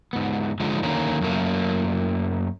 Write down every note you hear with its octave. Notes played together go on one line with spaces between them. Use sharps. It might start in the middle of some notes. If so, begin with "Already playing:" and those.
G#2 B3
G#2 D3 F3 G#3
D3 D#3 A#3 C#4
F#2 A3 A#3